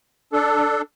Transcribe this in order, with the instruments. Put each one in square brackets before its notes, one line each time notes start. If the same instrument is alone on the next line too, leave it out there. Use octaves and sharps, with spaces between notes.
[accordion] D4 A4